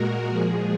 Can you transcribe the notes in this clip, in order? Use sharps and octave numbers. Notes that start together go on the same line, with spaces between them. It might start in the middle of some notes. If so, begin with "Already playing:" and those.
Already playing: A#2 G#3 F#4 A#4
A#2 F3 G#3 G#4